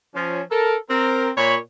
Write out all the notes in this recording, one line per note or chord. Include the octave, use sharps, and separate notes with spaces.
F3 C#4
A4 A#4
C4 A#4
A#2 C#5 B5